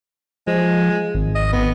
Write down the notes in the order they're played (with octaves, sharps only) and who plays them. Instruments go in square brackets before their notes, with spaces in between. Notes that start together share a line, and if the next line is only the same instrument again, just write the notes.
[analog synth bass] F3 [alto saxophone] G#3
[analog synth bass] G#1
[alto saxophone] D#5
B3